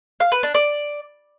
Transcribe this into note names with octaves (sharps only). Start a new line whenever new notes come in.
F5
B4
D4
D5